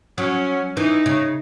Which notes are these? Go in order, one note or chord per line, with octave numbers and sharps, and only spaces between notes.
F#3 C#4
E3 D#4
C#3